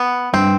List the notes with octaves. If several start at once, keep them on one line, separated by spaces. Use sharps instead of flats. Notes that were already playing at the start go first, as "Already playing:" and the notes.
Already playing: B3
G2 C4